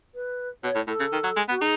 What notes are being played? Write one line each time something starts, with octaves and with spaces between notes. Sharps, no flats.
B4
B2 C#5
A2
A2 A4
C#3
D#3
F#3
G#3
B3 F#4
D#4 G#4